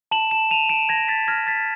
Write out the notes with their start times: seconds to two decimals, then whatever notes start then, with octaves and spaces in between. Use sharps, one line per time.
0.11 A5 E7 F#7
0.31 E7 F#7
0.51 A5 D#7 F7
0.70 D7 E7
0.89 A5 G#6 A#6
1.08 A6 B6
1.28 F6 G#6 A#6
1.47 A6 B6